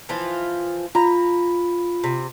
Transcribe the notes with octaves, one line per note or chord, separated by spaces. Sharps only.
E3 F3 F4
F4 A#5 B5
C3